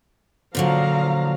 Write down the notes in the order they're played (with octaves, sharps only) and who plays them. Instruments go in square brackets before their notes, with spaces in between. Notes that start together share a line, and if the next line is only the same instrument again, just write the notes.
[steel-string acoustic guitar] A#2 D3 F#3 [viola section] F3 F5 A#5